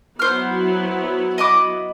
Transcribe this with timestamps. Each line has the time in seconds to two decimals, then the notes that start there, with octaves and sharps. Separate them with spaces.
0.19 F#3 B3 E4 C5 F6
1.38 D#5 B5 D6